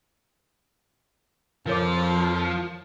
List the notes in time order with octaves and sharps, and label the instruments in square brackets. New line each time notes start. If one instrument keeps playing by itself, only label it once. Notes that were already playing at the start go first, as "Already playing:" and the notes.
[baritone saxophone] F2 [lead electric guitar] F3 [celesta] A#4 C#5 D6